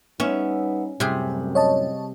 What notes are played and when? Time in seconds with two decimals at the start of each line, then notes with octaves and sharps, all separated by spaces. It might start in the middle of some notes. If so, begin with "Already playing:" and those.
0.20 G3 B3 C#4 D#4 E5
1.00 F#2 A2 C3 G3 G#4
1.55 C#5 D#5 A5